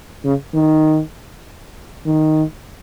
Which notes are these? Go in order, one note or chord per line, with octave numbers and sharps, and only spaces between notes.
C#3
D#3
D#3